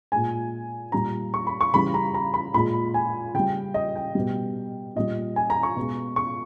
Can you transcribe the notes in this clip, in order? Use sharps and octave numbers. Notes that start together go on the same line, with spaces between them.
A#2 G#3 G#5
A#2 G3 A#5
C#6
B5
C#6
C#3 E3 G3 B5
A#5
A#5
B5
A#2 G#3 B5
G#5
C#3 G3 G5
D#5
G5
B2 G3
A#2 G3 D#5
G#5
A#5
C#6
B2 G#3
C#6